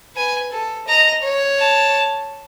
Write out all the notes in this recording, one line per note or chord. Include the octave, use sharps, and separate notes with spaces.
B4 G#5
A4
D#5 A#5
C#5
A5